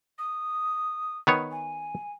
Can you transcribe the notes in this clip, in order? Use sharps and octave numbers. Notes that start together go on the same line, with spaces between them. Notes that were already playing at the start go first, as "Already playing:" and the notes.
D#6
D#3 B3 C#5
G#5